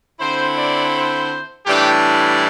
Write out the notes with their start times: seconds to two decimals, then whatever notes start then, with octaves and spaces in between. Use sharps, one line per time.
0.20 D3 C4 E4 C5
0.57 D5
0.94 C5
1.66 A2 E3 G3 D4 G4